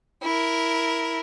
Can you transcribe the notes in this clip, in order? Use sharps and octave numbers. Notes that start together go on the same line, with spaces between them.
E4 A#4